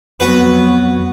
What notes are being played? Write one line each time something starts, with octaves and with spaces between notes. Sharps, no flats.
F2 F#3 B3 F#4 B4